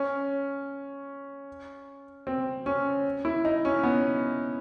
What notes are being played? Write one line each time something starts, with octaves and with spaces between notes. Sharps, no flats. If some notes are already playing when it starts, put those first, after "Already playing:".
Already playing: C#4
C4
C#4
E4
D#4
C#4
B3